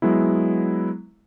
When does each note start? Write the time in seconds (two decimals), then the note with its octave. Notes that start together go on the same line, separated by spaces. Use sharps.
0.02 F#3 G#3 B3 E4